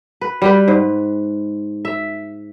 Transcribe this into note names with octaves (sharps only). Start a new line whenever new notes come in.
B4
G3 G4 B4
G#2
E5